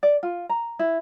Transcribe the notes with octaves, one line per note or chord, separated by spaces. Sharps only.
D5
F4
A#5
E4